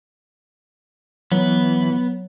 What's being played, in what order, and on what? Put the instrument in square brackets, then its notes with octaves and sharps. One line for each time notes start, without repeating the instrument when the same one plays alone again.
[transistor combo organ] E3 [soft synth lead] F#3 [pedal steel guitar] B3